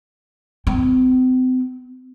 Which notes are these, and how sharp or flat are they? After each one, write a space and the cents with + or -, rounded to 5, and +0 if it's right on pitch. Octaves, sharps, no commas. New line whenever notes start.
C4 -40